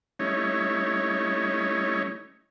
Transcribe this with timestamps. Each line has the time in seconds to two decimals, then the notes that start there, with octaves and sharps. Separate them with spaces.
0.19 G3 A3 C#4 D#4 E4 C#5